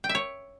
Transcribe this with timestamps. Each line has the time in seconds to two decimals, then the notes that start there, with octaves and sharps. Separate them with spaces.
0.04 G5
0.09 E5
0.15 C#5